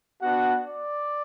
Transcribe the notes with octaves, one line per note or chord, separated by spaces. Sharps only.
B3 D4 F#4 F#5
D5